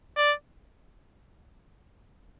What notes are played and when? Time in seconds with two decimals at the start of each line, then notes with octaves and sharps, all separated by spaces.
0.17 D5